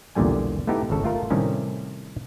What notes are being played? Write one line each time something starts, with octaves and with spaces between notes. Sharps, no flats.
B1 E2 A#2 D3 G3 G#5
A3 B3 D#4 E4 G4
G#1 C#3 A4
A3 F4 A#4
A2 C3 D#3 G3 C#4